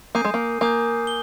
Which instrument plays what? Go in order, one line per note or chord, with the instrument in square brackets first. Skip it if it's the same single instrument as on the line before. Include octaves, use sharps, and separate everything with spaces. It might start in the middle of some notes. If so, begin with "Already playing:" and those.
[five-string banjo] A#3 [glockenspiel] G#5 D#6 G6 C7 D#7
[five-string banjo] G#3
A#3
[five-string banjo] A#3 [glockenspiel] G#5 D#6 G6
[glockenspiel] G7